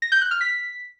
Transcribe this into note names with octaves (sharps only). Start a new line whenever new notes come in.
A#6
G6
F#6
F6
B6